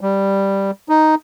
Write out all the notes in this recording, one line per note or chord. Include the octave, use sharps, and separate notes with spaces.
G3
D#4